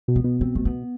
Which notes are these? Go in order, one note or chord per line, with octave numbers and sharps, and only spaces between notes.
B2
B3
B2
C4
A3
B3